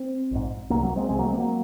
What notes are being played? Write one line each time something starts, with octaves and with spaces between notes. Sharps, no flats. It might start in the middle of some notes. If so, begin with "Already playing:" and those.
Already playing: C4
A#1 G#2
C2 C3 F#3 A#3
F#3 A#3
G#3 C4
C2 C3 G#3 C4
F#3 A#3
G#3 C4
F#3 A#3